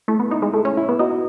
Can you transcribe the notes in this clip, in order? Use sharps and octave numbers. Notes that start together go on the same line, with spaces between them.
A3 E4
B3
D#4 E4
G#3
A3 E4
C#4
E4
B3
D#4 F#4